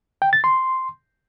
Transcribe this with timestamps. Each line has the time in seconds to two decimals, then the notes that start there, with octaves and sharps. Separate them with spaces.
0.22 G5
0.33 A6
0.44 C6